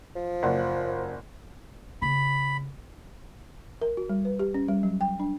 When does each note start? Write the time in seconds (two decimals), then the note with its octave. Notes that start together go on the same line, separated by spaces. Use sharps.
0.16 F3
0.43 F#1 D5 F#5
2.02 C#3 B5
3.82 A#4
3.97 F#4
4.09 G3
4.25 B4
4.39 G4
4.54 C#4
4.68 G3
4.83 F#3
5.01 G5
5.20 D4